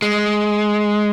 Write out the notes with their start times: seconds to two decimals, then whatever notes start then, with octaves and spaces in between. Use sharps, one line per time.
0.02 G#3